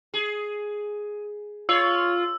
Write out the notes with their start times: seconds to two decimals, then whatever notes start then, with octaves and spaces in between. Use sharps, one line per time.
0.14 G#4
1.69 F4 C#5 E6